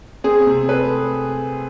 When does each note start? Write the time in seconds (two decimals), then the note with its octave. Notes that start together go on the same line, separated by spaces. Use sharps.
0.24 C4 G#4
0.47 C3
0.68 A3 B4